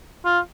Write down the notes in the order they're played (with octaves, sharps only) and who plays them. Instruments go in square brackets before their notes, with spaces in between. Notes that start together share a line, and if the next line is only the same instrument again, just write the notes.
[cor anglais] F4